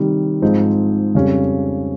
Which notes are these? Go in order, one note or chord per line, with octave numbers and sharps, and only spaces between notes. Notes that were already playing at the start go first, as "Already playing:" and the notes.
Already playing: C3 D#3 G3
G#2 F3 C4 D#4 G#4
F2 C#3 G3 C#4